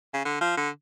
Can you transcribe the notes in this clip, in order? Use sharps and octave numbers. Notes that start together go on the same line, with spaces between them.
C#3
D3
F3
D3